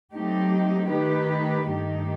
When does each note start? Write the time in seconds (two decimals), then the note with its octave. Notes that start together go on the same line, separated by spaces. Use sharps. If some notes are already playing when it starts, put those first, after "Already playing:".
0.13 F#3 A3 C4 D#4 G4
0.90 D#3 A3 D#4 G4 B4
1.68 G2 D#3 A3 D#4 G4